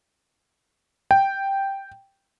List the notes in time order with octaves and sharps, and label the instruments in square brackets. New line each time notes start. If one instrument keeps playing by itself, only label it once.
[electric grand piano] G5